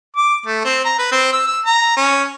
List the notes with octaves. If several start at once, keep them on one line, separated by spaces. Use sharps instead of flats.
D6
A3
C4
A#5
B4
C4
E6
E6
A#5
C#4